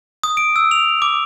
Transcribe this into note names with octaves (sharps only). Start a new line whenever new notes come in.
D#6
D7
E6
F7
D6